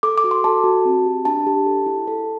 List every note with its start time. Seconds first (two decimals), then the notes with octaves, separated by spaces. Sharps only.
0.03 A4 D6
0.18 D6
0.24 F#4
0.31 C6
0.44 A4 A5
0.64 F#4
0.85 C4
1.06 G4
1.25 D4 A5
1.47 G4
1.66 A4
1.86 E4
2.07 A4